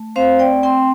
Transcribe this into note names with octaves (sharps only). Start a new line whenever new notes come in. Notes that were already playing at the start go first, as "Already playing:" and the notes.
Already playing: A3
C4 C5 F5
D5 G5
C4 G5 C6